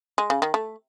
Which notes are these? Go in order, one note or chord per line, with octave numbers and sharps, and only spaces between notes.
G#3
C#3
D#3
A3